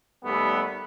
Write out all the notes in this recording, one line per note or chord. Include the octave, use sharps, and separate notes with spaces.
D#2 G3 A3 B3